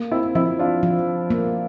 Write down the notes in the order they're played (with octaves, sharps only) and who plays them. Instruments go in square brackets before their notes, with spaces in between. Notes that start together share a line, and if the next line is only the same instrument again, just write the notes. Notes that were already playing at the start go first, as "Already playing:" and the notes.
Already playing: [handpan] A#3
[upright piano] C4 E4
[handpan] F3 [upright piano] C4 E4
[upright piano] D4 F4
[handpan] F3
A#3